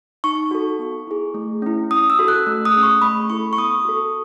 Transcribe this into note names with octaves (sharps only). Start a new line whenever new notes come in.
D#4 C#6
F#4 A4
B3
E4 G#4
A3
C#4 E4
C#4 D#6
E6
F#4 A4
F#6
A3 E6
D#6
C#4 G#4
C#6
A3 B5
E4 A4 C#6
C#6
B3 D#6
F#4 A4